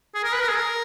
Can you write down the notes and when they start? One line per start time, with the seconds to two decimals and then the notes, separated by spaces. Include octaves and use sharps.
0.15 G#4
0.24 A#4
0.33 B4
0.41 A#4
0.48 G#4
0.56 A#4